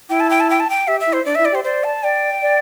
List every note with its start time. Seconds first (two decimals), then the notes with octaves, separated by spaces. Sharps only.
0.09 E4 G5
0.20 A5
0.30 G5
0.40 A5
0.50 G5
0.60 A5
0.70 G5
0.87 G4 E5
1.00 E5
1.06 E4
1.13 C5
1.25 D4 D5
1.35 E4 E5
1.45 D5
1.51 G4 C5
1.64 C5 D5
1.84 A5
2.03 D5 G5
2.42 D5